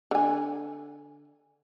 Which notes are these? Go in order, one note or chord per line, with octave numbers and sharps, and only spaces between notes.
D3 G#5